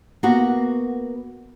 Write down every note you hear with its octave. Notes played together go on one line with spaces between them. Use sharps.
A#3 B3 F#4